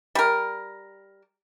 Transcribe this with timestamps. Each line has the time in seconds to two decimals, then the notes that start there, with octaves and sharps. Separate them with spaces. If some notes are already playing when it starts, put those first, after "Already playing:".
0.15 G3 A#4